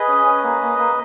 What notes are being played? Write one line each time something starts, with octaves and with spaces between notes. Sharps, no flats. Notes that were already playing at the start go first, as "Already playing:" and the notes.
Already playing: G#4 B4 D#5
C#4
C#4
A#3
A#3
A#3